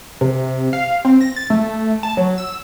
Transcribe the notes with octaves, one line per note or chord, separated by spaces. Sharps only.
C3
F5
C4
A#6
A6
A3
A5
F#3
E6